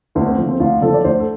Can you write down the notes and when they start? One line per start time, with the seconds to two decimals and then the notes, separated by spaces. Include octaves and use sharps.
0.15 D2 B3
0.26 C4
0.38 D3 F3
0.49 C4
0.60 D2 F4
0.82 D3 F3 A4
0.94 D5
1.04 D2 C5
1.20 A4